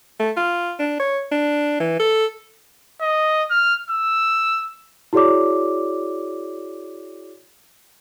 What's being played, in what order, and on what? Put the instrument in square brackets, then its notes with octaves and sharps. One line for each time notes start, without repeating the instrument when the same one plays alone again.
[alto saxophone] A3
F4
D4
C#5
D4
E3
A4
[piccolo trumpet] D#5
F6
E6
[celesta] E4 F#4 G#4 C#5 D5 D6